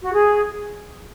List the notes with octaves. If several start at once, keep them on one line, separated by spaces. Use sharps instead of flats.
F#4
G#4